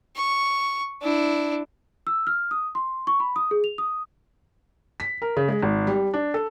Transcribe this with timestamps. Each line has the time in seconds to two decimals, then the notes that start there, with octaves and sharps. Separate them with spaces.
0.16 C#6
1.02 D4 E4
2.07 E6
2.27 F6
2.51 D#6
2.75 C6
3.07 C#6
3.20 B5
3.36 D#6
3.51 G#4
3.64 F7
3.78 D#6
5.00 B6
5.22 A#4
5.37 C#3
5.48 G#3
5.62 G#1
5.87 G3
6.13 D4
6.34 A4